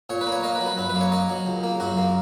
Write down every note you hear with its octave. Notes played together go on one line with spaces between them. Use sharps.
A#2 C#5
B4
A#3
C#5
A#3 D#5
B4
F#3
B4
F#2 B4
B4
A#3
C#5
A#3 D#5
F#3
C#2
A#3
F#2 F#4
A#3